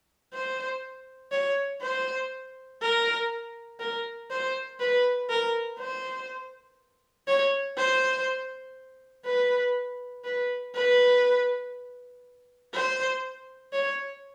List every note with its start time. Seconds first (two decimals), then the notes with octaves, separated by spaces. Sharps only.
0.34 C5
1.32 C#5
1.82 C5
2.82 A#4
3.80 A#4
4.30 C5
4.79 B4
5.30 A#4
5.79 C5
7.28 C#5
7.77 C5
9.25 B4
10.24 B4
10.75 B4
12.74 C5
13.73 C#5